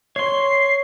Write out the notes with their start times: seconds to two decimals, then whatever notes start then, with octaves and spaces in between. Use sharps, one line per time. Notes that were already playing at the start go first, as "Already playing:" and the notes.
0.16 C#5 C6 C7